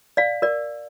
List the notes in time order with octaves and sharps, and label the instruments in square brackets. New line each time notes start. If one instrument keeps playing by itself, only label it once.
[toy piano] D5 F5
A#4 D5